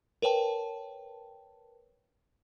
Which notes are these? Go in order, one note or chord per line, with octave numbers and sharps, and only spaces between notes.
A#4 B4 C#5 G5 A5